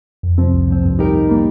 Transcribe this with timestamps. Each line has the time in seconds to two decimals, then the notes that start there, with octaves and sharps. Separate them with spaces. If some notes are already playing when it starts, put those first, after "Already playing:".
0.23 F2
0.38 C3 F3 C4
0.53 C2
0.68 A#2 F3 C4
0.84 G2
0.99 G3 D#4 G4 A#4
1.14 A#2
1.29 G3 A#3